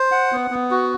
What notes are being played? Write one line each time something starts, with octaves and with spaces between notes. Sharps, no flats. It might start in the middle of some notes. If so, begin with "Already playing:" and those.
Already playing: C5
F#5
B3
B3
F#4